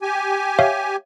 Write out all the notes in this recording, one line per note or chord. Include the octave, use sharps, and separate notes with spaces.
G4 G#5
C#5 E5 F5